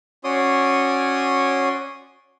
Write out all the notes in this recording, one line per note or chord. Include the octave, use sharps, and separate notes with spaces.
C#4 F#4 C#5 D5 C6 D#6